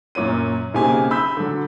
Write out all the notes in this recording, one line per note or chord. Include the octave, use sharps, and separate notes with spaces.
F#2 A#2 C#5 D#7
B1 C#3 A#3 C4 G4 G#5
B5 E6 G6 B6
D3 F#3